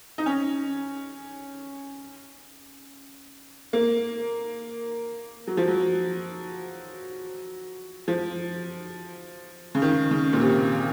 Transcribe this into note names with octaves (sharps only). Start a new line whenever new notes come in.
D#4
C#4
A#3
F#3
F3
F#3
F3
C#3
D#3
C#3
A#2
C3